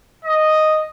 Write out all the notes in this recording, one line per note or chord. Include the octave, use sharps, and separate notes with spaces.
D#5